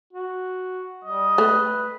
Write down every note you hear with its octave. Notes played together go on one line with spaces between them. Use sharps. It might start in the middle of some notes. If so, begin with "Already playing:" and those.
F#4
G3 D#5
A3 B4